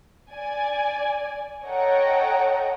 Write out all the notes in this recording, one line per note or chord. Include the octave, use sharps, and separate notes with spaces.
D5 G#5
A4 C#5 D#5 F#5 G5 A#5